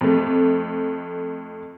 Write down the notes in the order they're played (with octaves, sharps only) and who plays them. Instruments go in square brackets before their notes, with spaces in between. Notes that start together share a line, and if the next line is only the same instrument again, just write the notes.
[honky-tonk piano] F2 A3